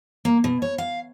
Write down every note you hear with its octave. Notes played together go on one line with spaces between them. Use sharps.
A#3
B2
C#5
F5